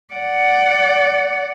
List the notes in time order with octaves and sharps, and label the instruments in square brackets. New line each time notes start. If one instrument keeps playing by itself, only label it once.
[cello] D5 F#5